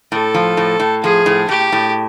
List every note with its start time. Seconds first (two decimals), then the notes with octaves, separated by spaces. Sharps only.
0.12 A2 A4
0.34 F3
0.57 A2
0.80 A2
1.03 F3 G#4
1.26 A2
1.49 A2 G4
1.72 A2